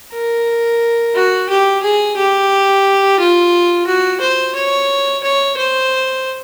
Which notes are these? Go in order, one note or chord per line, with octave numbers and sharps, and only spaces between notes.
A#4
F#4
G4
G#4
G4
F4
F#4
C5
C#5
C#5
C5